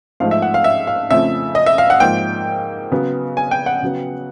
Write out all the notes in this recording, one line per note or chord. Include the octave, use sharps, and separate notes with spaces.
G#2 F3 A3 F5
E5
F#5
F5
E5
F5
F2 C#3 F3 A3 E5
D#5
E5
F5
F#5
G#2 F3 A#3 G5
C#3 F#3 B3
G#5
G5
F#5
C#3 F#3 B3